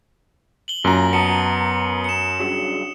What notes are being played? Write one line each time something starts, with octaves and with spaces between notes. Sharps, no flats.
F#7 G7
F#2 A#2 A#5
B3 A5 D#6 C#7
C#7 E7
G2 C#3 F#3